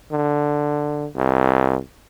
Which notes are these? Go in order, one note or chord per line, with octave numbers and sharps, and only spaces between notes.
D3
C2